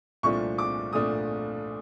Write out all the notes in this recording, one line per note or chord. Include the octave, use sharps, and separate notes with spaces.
C2 A#2 F3 A3 D4 C#6
D6
A#2 F3 A3 D4 D#6